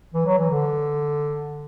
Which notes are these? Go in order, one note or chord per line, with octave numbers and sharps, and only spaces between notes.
E3
F#3
E3
D3